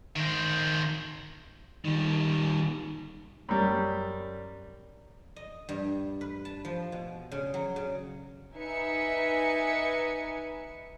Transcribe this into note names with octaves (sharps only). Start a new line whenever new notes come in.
D#3 C5
D#3 G3
F#2 G3
D#5
G2
B4
A5
F3
B2
C#3
F#3
C#3
D#4 B4 E5 G#5 C#7